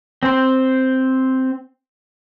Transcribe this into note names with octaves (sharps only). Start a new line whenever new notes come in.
C4 C5